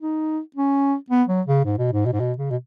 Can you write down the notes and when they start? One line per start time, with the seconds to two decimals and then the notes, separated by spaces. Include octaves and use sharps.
0.01 D#4
0.56 C#4
1.10 B3
1.28 F#3
1.47 C#3
1.65 G#2
1.79 B2
1.93 G#2
2.06 B2
2.13 G#2
2.20 B2
2.38 C#3
2.50 B2